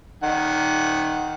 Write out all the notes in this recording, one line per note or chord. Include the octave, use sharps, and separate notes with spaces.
D#3 F#5